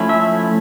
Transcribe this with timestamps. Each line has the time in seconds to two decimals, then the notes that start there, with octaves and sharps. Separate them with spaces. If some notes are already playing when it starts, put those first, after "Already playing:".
Already playing: F3 A3 C#4 E4
0.09 E5